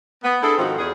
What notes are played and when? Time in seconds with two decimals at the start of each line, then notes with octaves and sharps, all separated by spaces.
0.24 B3
0.43 D4 E4 G#4 A4
0.58 G#2 D#3 F3 C4 D#4 F#4
0.79 E2 G#4